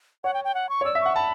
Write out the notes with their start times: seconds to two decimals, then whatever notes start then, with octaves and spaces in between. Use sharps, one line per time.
0.24 C#5 F#5
0.34 G5
0.44 G5
0.54 F#5
0.69 C#6
0.81 C#5
0.85 D5 E6
0.95 E5
1.01 F#5 C#6
1.16 A5 B5